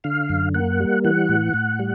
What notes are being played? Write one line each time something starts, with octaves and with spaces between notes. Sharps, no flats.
D3 F5
F#2
A#3 F#5
G3
E3 F#5
A2
A2
G3